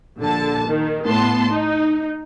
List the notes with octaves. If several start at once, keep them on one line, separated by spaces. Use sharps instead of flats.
A#1 D3 A5
D#3
A2 B3 A5 C6
D#4